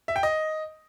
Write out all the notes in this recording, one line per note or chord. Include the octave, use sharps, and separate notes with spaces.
E5
G5
D#5